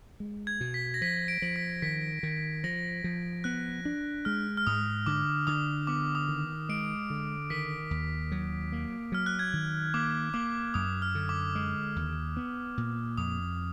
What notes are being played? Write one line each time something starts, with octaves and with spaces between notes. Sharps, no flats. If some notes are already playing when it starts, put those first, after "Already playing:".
G#3
G#6
B2
B6
A#6
F3 B6
D7
F3
B6
D#3 B6
D#3
F3 A#6
F3
B3 F#6
D4
G#3 F6
F6
G#2 D#6
D3 D6
D3 D#6
B3 D6
D#6
D#3
G#3 D7
D3
D#3 B6
D#2
F#3
A#3
F#3 F6
F#6
G#6
D#3
A#3 D6
D6
A#3 D6
F#2 D#6
F6
D3
D6
G#3
D#2
B3
A#2
F2 D#6